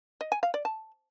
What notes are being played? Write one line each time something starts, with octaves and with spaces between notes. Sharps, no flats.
D#5
G#5
F5
D5
A5